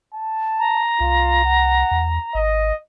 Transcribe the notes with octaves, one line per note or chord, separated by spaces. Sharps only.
A5
A#5
C2 F4
F#5
E2
G#1 D#5